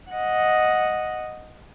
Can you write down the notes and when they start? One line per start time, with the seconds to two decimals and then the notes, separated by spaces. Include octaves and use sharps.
0.11 D#5 F#5